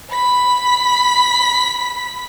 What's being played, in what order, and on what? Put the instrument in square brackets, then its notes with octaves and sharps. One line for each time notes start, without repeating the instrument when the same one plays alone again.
[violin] B5 B6